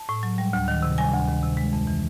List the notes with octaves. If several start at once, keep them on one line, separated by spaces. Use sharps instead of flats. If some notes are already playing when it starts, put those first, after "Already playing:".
Already playing: A5
A2
F#3
G3
D2
D#3
C3
G3 G#5
D2
D#3
C3
G#3
F2
E3